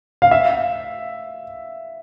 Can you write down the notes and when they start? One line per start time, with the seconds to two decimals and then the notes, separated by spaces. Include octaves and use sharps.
0.22 F5
0.31 E5